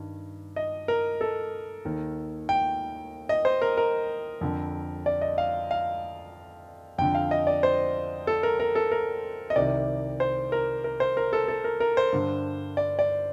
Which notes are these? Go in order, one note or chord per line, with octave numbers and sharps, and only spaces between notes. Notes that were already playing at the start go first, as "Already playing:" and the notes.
Already playing: G2 D#3
D#5
A#4
A4
D#2 D#3
G5
D#5
C5
A#4
A#4
F2 D3
D5
D#5
F5
F5
F2 D3 G5
F5
D#5
D5
C5
A4
A#4
A#4
A4
A#4
D#5
C2 C3 D#3 D5
C5
A#4
A#4
C5
A#4
A4
A4
A#4
A#4
C5
G2 D3
D5
D5